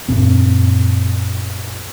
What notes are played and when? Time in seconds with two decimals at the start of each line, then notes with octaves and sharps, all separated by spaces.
0.09 F#2 A#2 C4